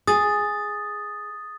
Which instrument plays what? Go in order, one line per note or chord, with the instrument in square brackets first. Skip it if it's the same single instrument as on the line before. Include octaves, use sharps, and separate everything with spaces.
[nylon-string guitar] G#4 [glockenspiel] D#6 A6